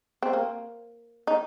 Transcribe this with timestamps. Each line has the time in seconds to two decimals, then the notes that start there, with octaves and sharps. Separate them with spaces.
0.23 C4
0.33 A#3
1.27 D#4